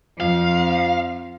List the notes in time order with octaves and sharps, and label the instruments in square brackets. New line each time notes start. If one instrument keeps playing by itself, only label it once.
[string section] F2 F3 [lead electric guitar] F5